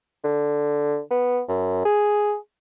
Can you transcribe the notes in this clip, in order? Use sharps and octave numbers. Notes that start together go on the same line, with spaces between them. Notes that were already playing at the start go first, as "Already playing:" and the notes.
D3
B3
F#2
G#4